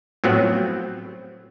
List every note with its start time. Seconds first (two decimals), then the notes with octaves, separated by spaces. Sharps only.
0.24 A2 F3 F#3 B3 C4